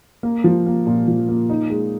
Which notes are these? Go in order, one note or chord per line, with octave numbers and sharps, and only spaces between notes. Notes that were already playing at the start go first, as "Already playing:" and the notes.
A#3
F3
A#3
A#2
F3
A#3
D#4
G#3